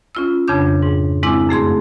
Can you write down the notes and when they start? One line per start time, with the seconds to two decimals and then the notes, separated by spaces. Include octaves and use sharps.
0.15 C#4 F4 E6
0.48 F2 C#3 D4 G6
0.82 G#2
1.23 G#3 C4 E4 D6
1.49 F#2 A3 G#4 C6